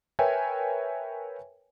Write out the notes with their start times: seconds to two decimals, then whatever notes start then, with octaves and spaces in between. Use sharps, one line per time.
0.19 A#4 B4 C#5 E5 G5 G#5